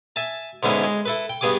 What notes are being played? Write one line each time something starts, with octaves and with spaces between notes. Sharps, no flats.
E5 G#5 A5
G#2 D3 B3 C#4 E4
G#3
E4 A4 B4
G5
G2 B3 G#4 G#5 D6